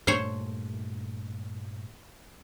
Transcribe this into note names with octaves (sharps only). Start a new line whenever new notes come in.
G2 A#2 A3 C5 C#5